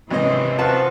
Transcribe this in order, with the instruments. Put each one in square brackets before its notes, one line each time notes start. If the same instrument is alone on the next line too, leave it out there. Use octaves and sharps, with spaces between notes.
[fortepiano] G#1 C#4 D#5 [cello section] C3 E3 C4
[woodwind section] F3 F4 F#4 [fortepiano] B4 F#5 A5